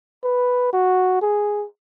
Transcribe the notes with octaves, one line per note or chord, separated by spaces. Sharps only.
B4
F#4
G#4